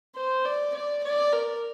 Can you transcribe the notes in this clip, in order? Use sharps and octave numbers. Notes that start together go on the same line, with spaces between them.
C5
D5
D5
D5
A#4